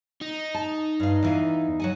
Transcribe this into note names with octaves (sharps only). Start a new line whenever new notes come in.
D#4
A5
G2 F5
E2 E3 F5
F#3 F#5 G#5